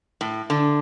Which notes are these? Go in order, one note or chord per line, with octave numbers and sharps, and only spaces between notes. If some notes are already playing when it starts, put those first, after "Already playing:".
A2
D3